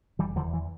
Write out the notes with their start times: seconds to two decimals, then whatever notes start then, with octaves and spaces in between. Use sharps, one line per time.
0.19 F1 E3 G3
0.36 E2 D3 F3
0.53 E3